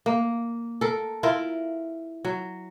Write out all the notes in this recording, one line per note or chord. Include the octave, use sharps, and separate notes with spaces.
A#3
A4 A#4
E4 F4 A#4
F#3